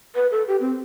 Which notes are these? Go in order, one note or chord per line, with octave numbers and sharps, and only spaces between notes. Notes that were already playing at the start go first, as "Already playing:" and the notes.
B4
A4
G4
C4